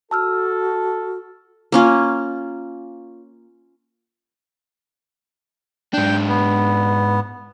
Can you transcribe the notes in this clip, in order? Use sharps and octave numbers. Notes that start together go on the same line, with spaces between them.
F#4 A4 A5 E6 F6
A#3 C#4 F4
G#2 D4 G5
B3